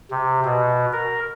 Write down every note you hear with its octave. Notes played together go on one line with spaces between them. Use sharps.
C3
B2
A#4